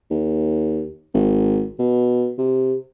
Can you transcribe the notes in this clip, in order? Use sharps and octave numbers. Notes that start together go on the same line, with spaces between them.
D#2
G#1
B2
C3